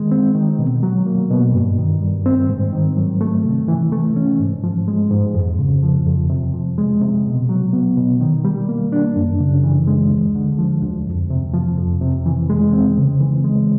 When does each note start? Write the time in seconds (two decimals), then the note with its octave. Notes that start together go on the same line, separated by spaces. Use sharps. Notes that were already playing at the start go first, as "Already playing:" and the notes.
Already playing: D#3 G#3
0.11 C4
0.35 D#3
0.59 B2
0.83 F#3
1.06 A#3
1.30 B2
1.54 G2
1.78 D#3
2.01 G3
2.26 C4
2.50 G#2
2.73 D#3
2.97 F#3
3.21 A3
3.45 C3
3.68 E3
3.92 A3
4.16 C#4
4.39 G#2
4.64 F3
4.88 G#3
5.11 G#2
5.34 F2
5.59 C#3
5.83 F3
6.06 F2
6.30 C3
6.54 F3
6.78 G#3
7.01 C3
7.26 B2
7.49 F#3
7.73 B3
7.97 B2
8.20 D#3
8.44 G3
8.69 A#3
8.92 D4
9.16 F#2
9.40 C#3
9.63 E3
9.87 G#3
10.11 D2
10.35 D3
10.59 F3
10.82 D2
11.07 F2
11.30 C3
11.54 F3
11.78 F2
12.01 C3
12.26 E3
12.50 G#3
12.73 C4
12.97 C#3
13.20 E3
13.44 G#3